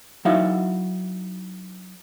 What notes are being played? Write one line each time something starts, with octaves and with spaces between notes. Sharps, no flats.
F#3 D#4 E4 F#4 E5 F5